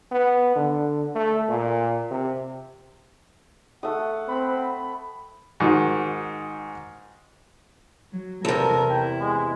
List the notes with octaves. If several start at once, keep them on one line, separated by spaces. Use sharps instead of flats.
B3
D3
A3
A#2
C3
A3 F#5 D#6
C4 B5
G#2 D#3 F#4
F#3
E2 C3 A4 A#4
E4 G5
G#3